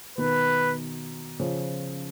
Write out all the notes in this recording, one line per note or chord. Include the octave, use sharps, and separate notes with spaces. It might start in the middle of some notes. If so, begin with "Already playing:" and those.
B2 D#3 B4
C#3 F3